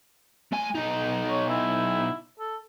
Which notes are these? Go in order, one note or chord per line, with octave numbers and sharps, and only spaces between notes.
A3 G#5
B2 D#4
C#5
E4
A4